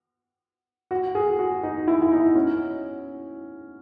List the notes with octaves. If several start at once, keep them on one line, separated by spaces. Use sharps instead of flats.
F#4
G#4
F#4
D#4
E4
E4
D#4
C#4